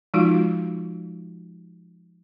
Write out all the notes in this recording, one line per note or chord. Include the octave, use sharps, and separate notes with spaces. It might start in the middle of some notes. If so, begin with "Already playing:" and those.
F3 G#3 D#4 F4 F#4 F5